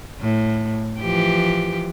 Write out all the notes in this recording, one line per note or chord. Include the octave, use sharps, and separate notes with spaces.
A2
E3 F3 G4